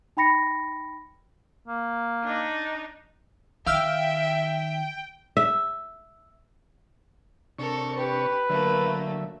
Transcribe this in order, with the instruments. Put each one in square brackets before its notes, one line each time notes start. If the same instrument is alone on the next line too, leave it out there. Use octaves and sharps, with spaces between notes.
[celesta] D#4 G5 B5 A#6 C#7
[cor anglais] A#3
[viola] D4 D#4
[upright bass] D#3 [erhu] E5 [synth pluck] F5 E6 F6 [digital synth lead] G5
[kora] E5
[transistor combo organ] C3 D4 C#6 [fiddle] A4 A#4
[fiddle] G4 [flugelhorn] B4
[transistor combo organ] D3 F#3 E5 [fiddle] A3 A#3